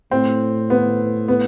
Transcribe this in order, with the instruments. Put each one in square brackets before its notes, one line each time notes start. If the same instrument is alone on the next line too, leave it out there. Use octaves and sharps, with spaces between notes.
[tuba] A2 [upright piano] C4
[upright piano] B3
B3